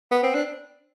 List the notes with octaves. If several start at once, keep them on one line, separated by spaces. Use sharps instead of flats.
B3
C4
D4